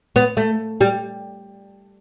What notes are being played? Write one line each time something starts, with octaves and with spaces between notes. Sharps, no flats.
B3
A3
G3